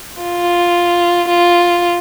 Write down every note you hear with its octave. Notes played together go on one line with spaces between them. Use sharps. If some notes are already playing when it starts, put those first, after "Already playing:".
F4
F4